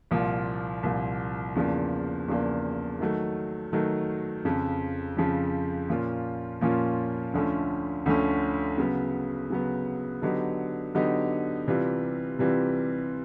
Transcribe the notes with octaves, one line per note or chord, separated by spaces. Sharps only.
C2 A#2 F3 A#3
C2 A#2 F3 A#3
E2 C#3 F3 A#3 D4
E2 C#3 F3 A#3 D4
D#3 F#3 A3
D#3 F#3 A3
F2 C#3 F3
F2 C#3 F3
A#2 F3 A#3 C#4 F4
A#2 F3 A#3 C#4 F4
D2 D3 F3 A3 C#4
D2 D3 F3 A3 C#4
C#3 F#3 B3
C#3 F#3 B3
D3 F#3 B3 D#4 G4
D3 F#3 B3 D#4 G4
C3 E3 G3 C4 F4
C3 E3 G3 C4 F4